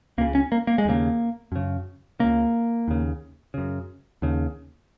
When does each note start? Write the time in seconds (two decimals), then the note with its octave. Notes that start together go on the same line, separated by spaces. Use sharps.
0.18 C#2 A#3
0.21 C#3
0.35 C#4
0.52 A#3
0.67 A#3
0.78 G#3
0.85 D#2 C#3 A#3
1.52 F#2 C#3
2.19 C#2 C#3 A#3
2.88 D#2 C#3
3.54 F#2 C#3
4.22 D#2 C#3